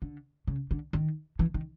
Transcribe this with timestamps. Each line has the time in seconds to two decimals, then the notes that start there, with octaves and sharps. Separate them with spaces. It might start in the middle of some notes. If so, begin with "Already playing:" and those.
0.02 D3
0.47 C#3
0.71 D3
0.93 D#3
1.39 E3
1.54 D#3